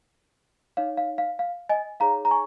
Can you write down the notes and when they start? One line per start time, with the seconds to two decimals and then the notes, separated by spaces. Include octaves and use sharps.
0.77 D#4 C#5 F5
0.97 F5
1.18 F5
1.39 F5
1.69 D#5 G#5
2.00 D#4 G#4 C#5 F5 A#5
2.25 A#5
2.31 G#5 C#6